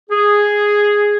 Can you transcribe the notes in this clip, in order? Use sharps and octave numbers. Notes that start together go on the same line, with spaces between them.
G#4